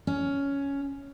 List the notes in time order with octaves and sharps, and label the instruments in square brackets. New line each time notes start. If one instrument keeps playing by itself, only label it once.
[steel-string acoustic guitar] C#4